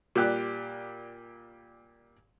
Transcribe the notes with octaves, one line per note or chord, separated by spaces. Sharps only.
A#2 G3 G4 F#6